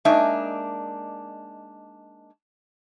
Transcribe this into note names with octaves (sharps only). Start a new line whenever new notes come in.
G#3 A#3 D4 D#4 E5